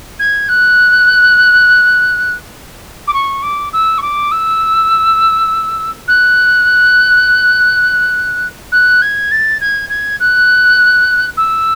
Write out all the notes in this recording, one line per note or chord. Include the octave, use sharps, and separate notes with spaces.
G#6
F#6
D6
C#6
D6
E6
C#6
D6
E6
F#6
F#6
G#6
A6
G#6
G#6
F#6
E6